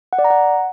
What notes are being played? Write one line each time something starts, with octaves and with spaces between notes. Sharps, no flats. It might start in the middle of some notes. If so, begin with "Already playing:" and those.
F#5
D5
A#5
F#5